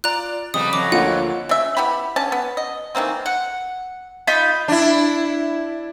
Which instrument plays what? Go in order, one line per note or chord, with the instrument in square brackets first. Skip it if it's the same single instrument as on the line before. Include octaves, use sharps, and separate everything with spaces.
[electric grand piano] F4 D5 [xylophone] A#5 F#6
[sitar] F2 G3 B3 [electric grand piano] C#3 [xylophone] D#6
[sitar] F2 F#3 [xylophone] D6
[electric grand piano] D2 D3 A#3 [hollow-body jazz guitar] F4 C#5 [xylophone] F#5
[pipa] C#3 E5
B3 E4 G4 B5
D3 C#4 A5
B3
D#5
D#3 E3 A#3 C4
[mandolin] F#5
D#4 F4 B5
[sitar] D4 E4